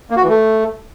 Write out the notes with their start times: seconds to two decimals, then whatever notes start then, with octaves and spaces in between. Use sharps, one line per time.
0.10 A#3
0.17 F#4
0.23 E3
0.29 A3